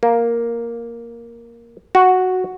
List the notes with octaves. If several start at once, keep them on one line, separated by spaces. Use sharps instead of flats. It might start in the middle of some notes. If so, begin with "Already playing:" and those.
A#3
F#4